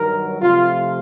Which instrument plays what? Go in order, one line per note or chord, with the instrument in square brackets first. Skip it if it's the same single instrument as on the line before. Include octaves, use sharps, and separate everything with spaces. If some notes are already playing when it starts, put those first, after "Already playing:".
Already playing: [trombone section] G2 D#3 F#3 A#4
C3 F3 A3 F4